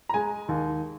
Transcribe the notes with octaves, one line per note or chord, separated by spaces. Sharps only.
A#5
G#3 G#5
D#2